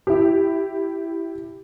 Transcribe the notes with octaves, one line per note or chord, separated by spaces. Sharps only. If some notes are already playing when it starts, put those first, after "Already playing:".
E4 G4